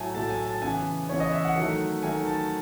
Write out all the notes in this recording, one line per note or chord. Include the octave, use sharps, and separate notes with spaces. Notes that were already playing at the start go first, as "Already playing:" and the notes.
Already playing: A2 F#3 A3 G#5 A5
A2 F#3 A3 A5
G#5
A5
C#3 E3 B3 G#5
C#3 E3 B3 C#5
D#5
E5
F#5
D#3 F#3 A3
D#3 F#3 A3 G#5
A5